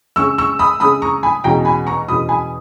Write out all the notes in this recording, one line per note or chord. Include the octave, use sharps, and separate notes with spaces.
C#3 G#3 C#4 C#6 E6
C#6 E6
B5 D#6
C#3 G#3 C#4 B5 D#6
A#5 C#6
G#5 B5
E2 B2 G#3 C#4 G5 A#5
G#5 B5
A#5 C#6
E2 B2 G#3 C#4 B5 D#6
G#5 B5